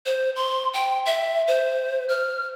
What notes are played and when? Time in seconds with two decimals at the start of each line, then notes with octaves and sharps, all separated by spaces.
0.06 C5
0.36 C6
0.74 G5
1.06 E5
1.48 C5
2.09 F6